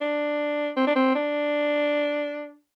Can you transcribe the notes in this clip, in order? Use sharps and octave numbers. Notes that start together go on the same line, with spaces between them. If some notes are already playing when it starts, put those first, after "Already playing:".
D4
C4
D4
C4
D4